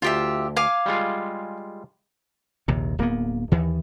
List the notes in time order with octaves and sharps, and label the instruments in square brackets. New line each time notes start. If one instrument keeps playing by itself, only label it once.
[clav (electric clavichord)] D2 [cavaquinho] F4 G4 E5
[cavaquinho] F5 G#5 D6
[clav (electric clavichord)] G3 G#3 F4
[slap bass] A#1 D#2 C3
D1 A#3 B3
D#2 D#3 E3